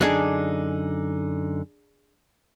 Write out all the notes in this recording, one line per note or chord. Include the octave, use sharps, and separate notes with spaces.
F#2 D3 D4 D#4 G#4